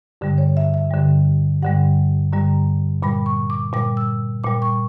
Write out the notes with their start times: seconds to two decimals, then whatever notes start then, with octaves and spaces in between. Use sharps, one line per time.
0.21 G2 D3 G3
0.38 C#5
0.57 E5
0.74 E5
0.91 G2 D3 G3
1.62 G2 D3 G3 F#5
2.32 G2 D3 G3 A#5
3.02 A#2 G3 B5
3.26 C#6
3.50 D6
3.73 A#2 G3 D6
3.97 E6
4.44 A#2 G3 D6
4.62 C#6